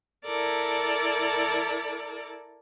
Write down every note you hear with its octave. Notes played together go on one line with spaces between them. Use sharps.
E4 A4 A#4 D5